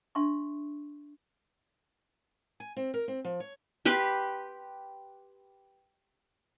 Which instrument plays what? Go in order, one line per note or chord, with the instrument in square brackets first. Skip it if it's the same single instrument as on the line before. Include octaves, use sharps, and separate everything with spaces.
[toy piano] D4 E5 C6 C#6
[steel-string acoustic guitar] G#5
C4
A#4
C4
F3
C#5
[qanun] G4 B4 C6